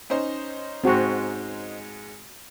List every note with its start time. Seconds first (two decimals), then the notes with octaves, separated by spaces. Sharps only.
0.10 C#4 D#4 C5
0.84 G#2 G#3 C4 F#4